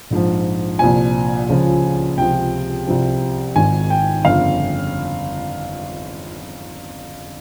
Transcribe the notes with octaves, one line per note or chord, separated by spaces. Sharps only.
A#1 G#2 F3
C2 A#2 F3 G#5
C#2 C#3 F3
C#2 C3 F3 G5
C2 C3 F3
G#1 G#2 D#3 G#5
G5
G1 F2 C#3 F5